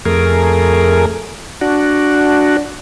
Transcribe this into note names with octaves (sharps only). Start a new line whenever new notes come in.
F2 A3 G#4 A#4
D4 F#4